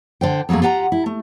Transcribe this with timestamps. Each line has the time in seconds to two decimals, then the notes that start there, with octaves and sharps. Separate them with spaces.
0.21 D3 C5 G5
0.49 F2 F#3 A3 A#3 G#4
0.62 F4 G4 F#5 A5 A#5
0.92 E4
1.06 A3